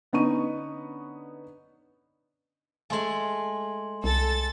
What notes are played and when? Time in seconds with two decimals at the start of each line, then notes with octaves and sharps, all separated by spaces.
0.13 D3 B3 C#4 D#4 C#6 D#7
2.90 G#3 A3 G#5 C6 F#7
4.04 C2 A4 A6